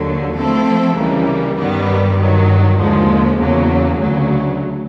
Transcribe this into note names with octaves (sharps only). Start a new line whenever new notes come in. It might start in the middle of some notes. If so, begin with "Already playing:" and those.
Already playing: D#2 D3 F#3
F3 A3 C4 E4 A4
C#2 C#3 E3 G3 A#3
G2 D#3 G3 B3
G2 D#3 F#3
D#2 D3 F3 G#3
E2 C#3 F#3 A#3
D2 C#3 F#3